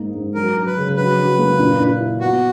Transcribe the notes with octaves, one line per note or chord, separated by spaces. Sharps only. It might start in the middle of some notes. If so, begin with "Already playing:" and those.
Already playing: G#2 A#3 D#4
G#2
F#3 A#4
F#3
B4
C#3
F#3 B4
F#3
A#3
A#2
A#2
E4
B3 F#4